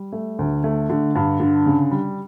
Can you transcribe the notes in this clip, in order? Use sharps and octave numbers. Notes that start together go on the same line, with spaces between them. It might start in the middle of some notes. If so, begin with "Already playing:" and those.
Already playing: G3
A3
D2
A3
D3
G2
D3
C#3
G3